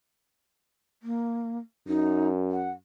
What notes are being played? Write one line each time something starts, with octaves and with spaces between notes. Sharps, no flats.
A#3
F#2 D#4
F#5